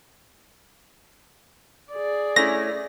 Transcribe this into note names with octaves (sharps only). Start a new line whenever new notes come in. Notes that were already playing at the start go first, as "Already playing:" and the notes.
G#4 D5
A3 C#4 E4 A#6